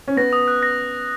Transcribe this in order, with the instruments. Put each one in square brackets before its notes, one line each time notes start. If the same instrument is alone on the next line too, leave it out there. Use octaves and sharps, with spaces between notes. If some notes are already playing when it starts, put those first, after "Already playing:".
[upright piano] C#4
[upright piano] B3 [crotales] A#6
[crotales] D#6
F#6
A#6